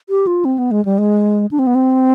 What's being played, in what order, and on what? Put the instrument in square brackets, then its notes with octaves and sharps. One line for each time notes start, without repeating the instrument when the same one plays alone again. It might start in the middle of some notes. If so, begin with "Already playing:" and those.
[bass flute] G4
F4
C4
B3
G#3
G3
G#3
D4
C4
B3
C4